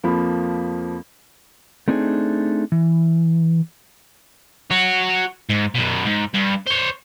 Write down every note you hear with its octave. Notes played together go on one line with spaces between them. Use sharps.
F2 F3 A#3 F4 B5
A3 C4 D4 D#4 F#4 G#4
E3
F#4 C#5
G#2
F#2 B2
G#2
G2
C5 C#5